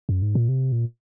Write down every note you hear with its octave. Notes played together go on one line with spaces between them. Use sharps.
F#2
G#2
A#2
C3
A#2